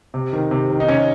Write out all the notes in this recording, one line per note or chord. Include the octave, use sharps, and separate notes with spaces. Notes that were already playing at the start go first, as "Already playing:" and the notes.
C3
D#3
C3
D#3
D#4
C3 C#4